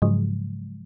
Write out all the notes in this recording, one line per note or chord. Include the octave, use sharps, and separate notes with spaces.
G#2 C#3 F3 F#3 G#3